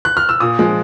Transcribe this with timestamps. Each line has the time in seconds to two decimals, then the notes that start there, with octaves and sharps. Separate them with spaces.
0.05 F#6
0.17 F6
0.29 E6
0.40 A#2 D#6
0.59 F3 G#3